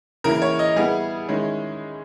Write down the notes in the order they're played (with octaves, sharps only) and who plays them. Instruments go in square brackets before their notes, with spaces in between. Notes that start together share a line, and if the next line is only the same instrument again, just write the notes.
[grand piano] C#3 E3 A#3 E4 A#4
C#5
D#5
G3 B3 E4 G#4
D#3 G#3 C#4 E4